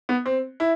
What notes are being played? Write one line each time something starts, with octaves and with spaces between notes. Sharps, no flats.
B3
C4
E4